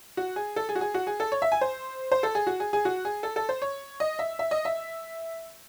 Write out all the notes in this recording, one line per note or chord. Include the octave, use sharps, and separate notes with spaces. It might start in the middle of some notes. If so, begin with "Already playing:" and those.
F#4
G#4
A4
G#4
F#4
G#4
F#4
G#4
A4
C#5
E5
G#5
C5
C5
A4
G#4
F#4
G#4
G#4
F#4
G#4
A4
A4
C5
C#5
D#5
E5
E5
D#5
E5